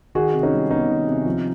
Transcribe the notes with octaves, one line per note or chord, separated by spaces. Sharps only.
D#3 F#4 G#4
C3
C#4 D#4
G3
B3 C#4 D#4
D#3
C3
F3